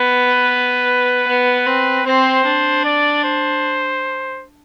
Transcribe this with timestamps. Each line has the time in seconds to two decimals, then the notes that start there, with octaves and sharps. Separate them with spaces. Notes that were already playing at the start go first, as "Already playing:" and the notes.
Already playing: B3 B4
1.27 B3
1.67 C4
2.06 C4 C5
2.45 D4
2.85 D5
3.24 C5